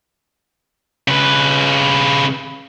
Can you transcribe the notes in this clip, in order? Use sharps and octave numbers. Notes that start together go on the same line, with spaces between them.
C#3 B4